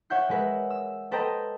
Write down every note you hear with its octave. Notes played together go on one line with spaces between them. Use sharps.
C#5 E5 F#5 F#6 G6 C7
G#3 A#4 B4 E5
E6
A4 B4 C5 D#5 G5 A#5